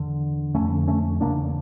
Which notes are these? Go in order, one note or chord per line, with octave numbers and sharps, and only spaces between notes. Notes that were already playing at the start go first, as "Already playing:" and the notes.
Already playing: E2 D3
F2 D3 A3 C#4
A3 C#4
E2 C#3 A#3 D4